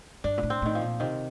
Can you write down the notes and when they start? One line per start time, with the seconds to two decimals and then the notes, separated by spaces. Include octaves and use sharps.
0.24 G2 D4
0.37 A#2
0.43 A2
0.50 C4
0.62 A2 D#3
0.75 F3
0.81 A#2
1.00 C3 D#3